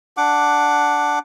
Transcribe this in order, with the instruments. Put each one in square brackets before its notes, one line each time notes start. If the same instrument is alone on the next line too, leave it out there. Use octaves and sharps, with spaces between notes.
[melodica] D4 F#5 D6